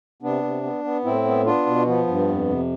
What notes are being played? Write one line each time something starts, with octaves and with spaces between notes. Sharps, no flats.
C3 B3 D4
C3
B3
B3
A2 C4 E4
B3
B3 D4 F4
B2
F3 B3
G2
F2
C3